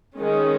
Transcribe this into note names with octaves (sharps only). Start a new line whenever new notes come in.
D#3 G#3 C#4